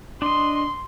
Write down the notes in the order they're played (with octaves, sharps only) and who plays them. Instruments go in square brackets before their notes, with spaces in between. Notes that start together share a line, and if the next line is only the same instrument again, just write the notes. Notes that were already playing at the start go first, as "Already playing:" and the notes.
[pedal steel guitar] D4 D#5 [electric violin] C6